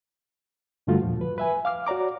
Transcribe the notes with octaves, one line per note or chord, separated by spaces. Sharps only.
G2 D3 G3 A3 F4 F#4
E2 A#2 F3
B4
B4 E5 G#5
F5 D6 F6
F#4 C#5 D5 A#5 D6